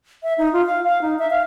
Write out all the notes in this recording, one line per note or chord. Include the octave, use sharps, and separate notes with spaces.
E5
D#4
F4
F5
F5
D#4
E5
F5